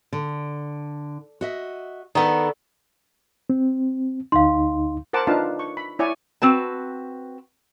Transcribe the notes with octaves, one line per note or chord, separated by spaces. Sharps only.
D3
F#4 D#5 E5
D#3 B3 A4 D5
C4
D2 D#4 F5 C6
A#4 C5 F#5 A5 D6
D4 D#4 F4 B4 F5 A5
C#6
B5
E4 C#5 D5 G#5 C#6
C4 F#4 B4 A5